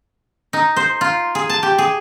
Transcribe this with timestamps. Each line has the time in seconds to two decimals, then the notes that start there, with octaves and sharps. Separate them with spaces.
0.53 D#4
0.76 C5
1.01 F4
1.35 G#4
1.50 A5
1.63 G4
1.78 G#4